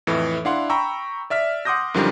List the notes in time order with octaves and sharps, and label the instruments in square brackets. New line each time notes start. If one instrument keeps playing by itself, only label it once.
[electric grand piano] F2 A2 E3
D4 E4 F5 F#5 C6
G5 A#5 B5 C#6 E6
D5 E5 F6 B6
F#5 C6 D6 D#6 G6 A#6
F#2 D3 D#3 F3 G3